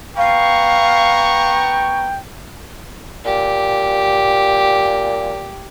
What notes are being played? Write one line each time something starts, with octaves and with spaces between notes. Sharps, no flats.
B3 F5 G5 A#5 C#6
A#2 G4